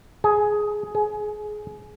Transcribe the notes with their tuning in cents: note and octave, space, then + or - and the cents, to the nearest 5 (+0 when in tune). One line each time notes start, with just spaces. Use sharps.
G#4 +10
G#4 +25